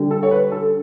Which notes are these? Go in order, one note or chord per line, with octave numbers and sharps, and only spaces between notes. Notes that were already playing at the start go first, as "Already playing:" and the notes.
Already playing: D3 G3 D4
A4
C#5
B4
A4